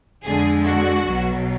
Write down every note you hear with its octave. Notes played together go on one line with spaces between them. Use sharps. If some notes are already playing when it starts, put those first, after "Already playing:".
F2 D3 G#3 G#4
F#4
B1 B2 F#3